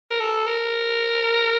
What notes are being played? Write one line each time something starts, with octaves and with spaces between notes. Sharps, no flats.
A#4
A4
A#4